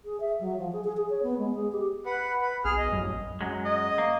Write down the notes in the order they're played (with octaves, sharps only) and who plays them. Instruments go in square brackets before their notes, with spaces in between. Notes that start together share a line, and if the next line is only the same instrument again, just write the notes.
[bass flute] G#4
E5
F#3
F3
G#4
G#4
G#4
C#5
B3
G#3
G#4
G4
[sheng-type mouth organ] B4 F#5
B4
[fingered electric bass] B1 [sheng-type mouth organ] G#4 F6
[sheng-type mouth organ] D#5
[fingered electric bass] A1 F#2 F#3
[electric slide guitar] F#2 F#3 G#3
[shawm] D#5
[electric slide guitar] A#3